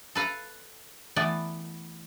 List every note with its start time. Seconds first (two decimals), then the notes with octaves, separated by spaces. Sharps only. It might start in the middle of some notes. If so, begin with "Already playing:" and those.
0.15 A4 B4 F5 A#5
1.16 E3 A3 B3 D5